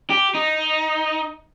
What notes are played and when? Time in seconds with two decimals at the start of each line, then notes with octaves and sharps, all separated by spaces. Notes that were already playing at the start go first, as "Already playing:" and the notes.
0.10 G4
0.35 D#4